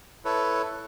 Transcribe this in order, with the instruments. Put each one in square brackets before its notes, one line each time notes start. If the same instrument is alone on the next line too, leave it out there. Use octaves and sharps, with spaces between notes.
[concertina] E4 A4 B4 C#5